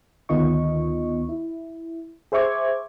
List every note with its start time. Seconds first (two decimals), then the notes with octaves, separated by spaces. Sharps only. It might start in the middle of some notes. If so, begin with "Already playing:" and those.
0.29 D2 D#3 B3 F4 D#5 C#6
1.29 E4
2.32 G#4 C5 E5 C#6 D6 G#6